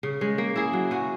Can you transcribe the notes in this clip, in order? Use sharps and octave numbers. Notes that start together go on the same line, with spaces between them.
C#3
G#3 C#4
A#3
E4 G#4
F#3
C#4 F#4